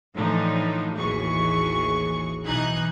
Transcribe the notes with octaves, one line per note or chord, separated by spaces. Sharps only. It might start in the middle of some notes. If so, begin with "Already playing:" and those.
A2 D3 E3 F3 D4 D#4
A1 D#2 E3 F#4 G#4 C#6
B1 E3 D#4 A#5 F#6 G#6